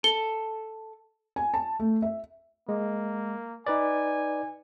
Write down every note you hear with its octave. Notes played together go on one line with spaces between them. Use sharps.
A4 G7
G#5
A5
A3
E5
G#3 A#3
D#4 B4 D5 G#5